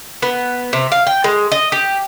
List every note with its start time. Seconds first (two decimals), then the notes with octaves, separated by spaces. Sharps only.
0.22 B3
0.73 C3
0.92 F5
1.07 G5
1.24 G#3
1.52 D#5
1.72 G4